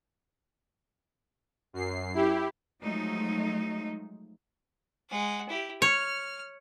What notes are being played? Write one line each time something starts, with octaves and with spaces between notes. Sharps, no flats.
F#2 C7
E4 G4
F3 F#3 G#3 A3 D#4
G#3 F#5
E4 G4
C#5 F6